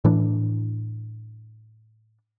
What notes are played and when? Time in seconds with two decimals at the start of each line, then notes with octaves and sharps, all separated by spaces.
0.05 A2 E3 D4